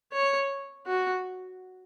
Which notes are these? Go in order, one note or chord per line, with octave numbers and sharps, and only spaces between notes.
C#5
F#4